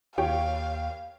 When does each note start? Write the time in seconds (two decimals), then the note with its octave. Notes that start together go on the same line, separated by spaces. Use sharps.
0.18 D#2 G4 C#5 F5 G5